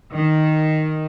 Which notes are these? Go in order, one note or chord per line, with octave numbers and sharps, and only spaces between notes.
D#3